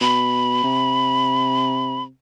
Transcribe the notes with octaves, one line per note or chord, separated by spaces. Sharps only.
B2 B5
C3